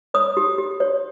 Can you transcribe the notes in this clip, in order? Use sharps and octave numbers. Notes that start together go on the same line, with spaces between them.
C#5 D#6
G4
G4
C#5